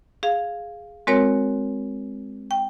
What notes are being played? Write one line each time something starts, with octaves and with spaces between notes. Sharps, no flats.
G#4 F5
G#3 C4 F#4 A#4 C#5
G5